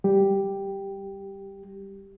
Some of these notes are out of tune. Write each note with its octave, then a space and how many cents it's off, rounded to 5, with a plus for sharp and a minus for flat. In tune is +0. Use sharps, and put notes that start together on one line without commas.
G3 +0 G4 +0